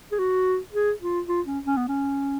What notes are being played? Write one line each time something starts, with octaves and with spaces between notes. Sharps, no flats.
G#4
F#4
G#4
F4
F4
C#4
C#4
B3
C#4